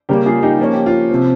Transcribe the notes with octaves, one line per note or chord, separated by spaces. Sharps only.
C#3 G3 A#3 G4 A#4
F4 G#4
D#4 G4
F3 A#3 C#4 F4
G4
F4
C3 F3 C4